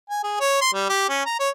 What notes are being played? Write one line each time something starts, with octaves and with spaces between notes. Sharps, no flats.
G#5
G#4
C#5
C6
G3
G4
C#4
A#5
C#5